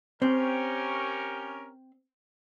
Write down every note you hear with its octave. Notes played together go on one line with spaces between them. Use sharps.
C4 C#4 G4 A#4